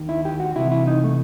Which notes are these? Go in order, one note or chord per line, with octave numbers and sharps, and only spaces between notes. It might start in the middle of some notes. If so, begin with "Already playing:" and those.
Already playing: D#2 D#3
E4
G4
F#4
C2 C3 E3 E4
E4
D#4
A3